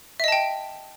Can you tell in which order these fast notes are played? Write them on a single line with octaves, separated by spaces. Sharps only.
E5 D#5 A5 G5